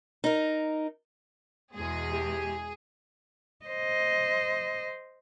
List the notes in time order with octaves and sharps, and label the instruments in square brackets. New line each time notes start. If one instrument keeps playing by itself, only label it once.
[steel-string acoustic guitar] D#4 A#4
[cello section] E2 B2 G#3 [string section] G#4
[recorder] G4
[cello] C5 D#5